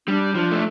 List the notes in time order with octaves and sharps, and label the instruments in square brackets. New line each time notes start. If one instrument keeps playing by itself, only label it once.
[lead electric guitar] G3 [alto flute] D4
[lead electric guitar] F3 [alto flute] D4
[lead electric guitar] A3